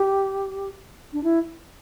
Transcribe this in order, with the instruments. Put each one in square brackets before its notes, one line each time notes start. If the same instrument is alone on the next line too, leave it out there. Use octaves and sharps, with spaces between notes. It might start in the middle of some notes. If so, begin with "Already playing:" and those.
Already playing: [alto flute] G4
D4
E4